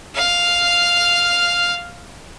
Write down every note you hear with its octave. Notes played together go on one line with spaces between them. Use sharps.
F5 F6